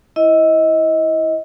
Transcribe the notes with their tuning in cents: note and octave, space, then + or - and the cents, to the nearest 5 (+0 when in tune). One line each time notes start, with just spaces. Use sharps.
E4 +0 D#5 +25